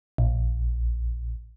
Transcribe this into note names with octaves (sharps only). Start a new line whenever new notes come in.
A#1